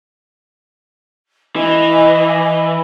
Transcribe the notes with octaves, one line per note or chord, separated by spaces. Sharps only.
E3 D#5